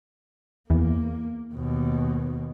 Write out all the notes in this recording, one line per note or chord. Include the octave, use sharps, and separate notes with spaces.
E2 A#3
D#2 B2